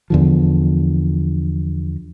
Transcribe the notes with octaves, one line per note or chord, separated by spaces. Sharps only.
E2 D3 F3